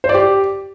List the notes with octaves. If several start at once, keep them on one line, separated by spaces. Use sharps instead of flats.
C5
D5
G4